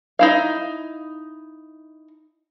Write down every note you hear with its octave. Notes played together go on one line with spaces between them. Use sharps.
D#4 E4 F5